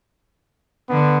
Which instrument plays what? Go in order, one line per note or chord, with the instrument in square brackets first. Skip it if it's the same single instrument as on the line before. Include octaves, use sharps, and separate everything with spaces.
[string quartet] D3 [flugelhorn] B3